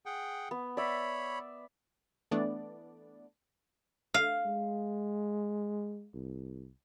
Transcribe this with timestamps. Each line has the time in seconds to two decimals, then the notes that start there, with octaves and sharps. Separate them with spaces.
0.06 G#4 F#5 G5
0.51 B3
0.77 C#5 D5 E5 B5
2.31 E3 A3 B3 D4 D5
4.14 F5
4.46 G#3
6.14 C2